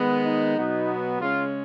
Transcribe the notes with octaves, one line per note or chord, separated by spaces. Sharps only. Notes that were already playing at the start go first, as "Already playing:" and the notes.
Already playing: D#3 G#3 B3
D#4
B2 F#3 B3
C#3 G#3 C#4 F4